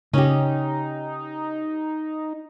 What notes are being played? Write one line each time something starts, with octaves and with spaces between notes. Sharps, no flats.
C#3 C#4 D#4 G4